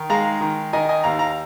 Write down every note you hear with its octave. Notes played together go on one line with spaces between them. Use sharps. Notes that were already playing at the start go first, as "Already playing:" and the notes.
Already playing: D#3
G#3 F5 A#5
D#3
D#3 D#5 G#5
D#5 G#5
D#2 F5 A#5
F5 A#5